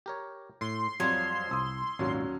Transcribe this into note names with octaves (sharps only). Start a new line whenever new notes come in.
G4 A#4 C#5
A2 C6
F2 F#3 G3 F4 C#5
C2 D#6 E6
G#1 D#2 A#2 F#3 C#4